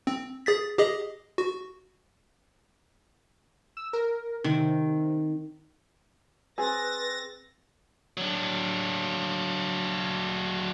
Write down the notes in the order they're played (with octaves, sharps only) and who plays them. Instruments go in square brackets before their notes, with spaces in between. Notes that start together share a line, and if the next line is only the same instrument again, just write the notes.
[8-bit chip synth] C4
G#4 A6 B6
G4 G#4 D#5
F#4
[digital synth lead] E6
A#4
[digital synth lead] C3 [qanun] D#3
[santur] C4 [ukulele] G#4 [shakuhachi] B4 [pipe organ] A6 A#6
[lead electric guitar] F#3 D4